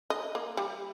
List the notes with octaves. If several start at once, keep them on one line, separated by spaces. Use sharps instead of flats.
D#5
A#3
G3